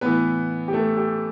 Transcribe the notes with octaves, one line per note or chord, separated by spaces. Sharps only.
A2 E3 B3 B4
G4
A3 A4
G4